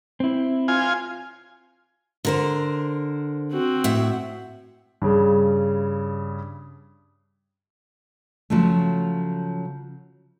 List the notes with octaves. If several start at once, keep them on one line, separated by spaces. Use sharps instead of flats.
C4 E4
F4 G#5
D3 A#4 C5
C4 F#4
A2 E5 F#5
G2 C#3
C#3 F3 F#3 A3